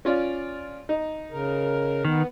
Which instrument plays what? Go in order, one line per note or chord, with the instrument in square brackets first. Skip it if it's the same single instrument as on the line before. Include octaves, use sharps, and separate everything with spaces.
[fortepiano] C#4 F4 D5
D#4
[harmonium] C#3 A#4
[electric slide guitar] D#3 [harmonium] B3